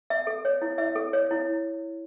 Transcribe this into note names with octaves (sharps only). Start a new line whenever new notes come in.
E5
A4
C#5
E4
E5
A4
C#5
E4